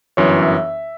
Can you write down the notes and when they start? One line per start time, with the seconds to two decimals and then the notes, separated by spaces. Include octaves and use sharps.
0.17 G1 F#2 E3 C#5
0.43 E5